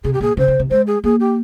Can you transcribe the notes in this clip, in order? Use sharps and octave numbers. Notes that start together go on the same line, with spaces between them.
C3 G#4
G4
A#2 G#4
C#3 C5
C#3
C3
G#3 C5
G#4
A#3 G#4
G4